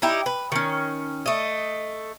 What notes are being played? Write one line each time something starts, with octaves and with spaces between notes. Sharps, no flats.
D#4 E4 G4
B4
D#3 C#4
A3 D#5